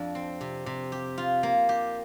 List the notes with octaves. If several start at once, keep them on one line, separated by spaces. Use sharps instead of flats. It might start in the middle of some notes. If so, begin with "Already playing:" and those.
Already playing: F2 D4
C4
C3
C3
G4
F4
A#3
G4